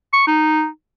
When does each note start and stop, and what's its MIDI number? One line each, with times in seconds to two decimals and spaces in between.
0.13 0.22 85
0.27 0.68 63